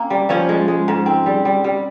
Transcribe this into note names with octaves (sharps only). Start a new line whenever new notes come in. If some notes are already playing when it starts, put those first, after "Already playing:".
Already playing: A#3 C4 C#4
G3
F3 C#4 C#5
G#3
G#3
G#2
C4
G3
G3
G3